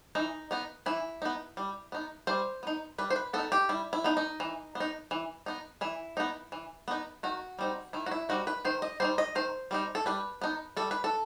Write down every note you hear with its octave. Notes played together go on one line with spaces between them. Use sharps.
E3 D#4
B3 D#4
E3 E4
B3 D#4
G3
B3 D#4
G3 C5
B3 D#4
G3 B4
C5
B4
B3 D#4 A4
G4
G3 E4
E4
B3 D#4
D#4
E3
B3
D#4
E3
B3 D#4
E3 E4
B3 D#4
E3
B3 D#4
D#3 F#4
G3 C4 D#4
D#3 E4
F#4
E4
G3 C4 D#4 F#4
B4
D#3 C5
D#5
G3 C4 D#4 C5
D#5
D#3 C5
G3 C4 D#4
A4
G3 B4
B3 D#4
G3 A4
B4
A4